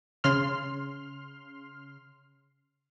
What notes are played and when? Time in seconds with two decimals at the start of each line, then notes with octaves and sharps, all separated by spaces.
0.24 C#3 C6 F6